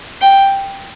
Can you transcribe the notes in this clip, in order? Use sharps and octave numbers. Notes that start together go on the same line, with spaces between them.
G5